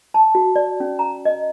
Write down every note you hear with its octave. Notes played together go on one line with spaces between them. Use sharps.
A5
F#4
D5
C#4
A#5
D#5